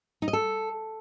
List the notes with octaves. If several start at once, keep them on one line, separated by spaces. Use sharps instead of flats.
D#4
D#5
A4